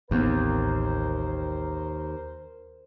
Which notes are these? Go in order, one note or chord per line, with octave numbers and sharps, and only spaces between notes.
A1 D#2 B3 C4 A#4 C5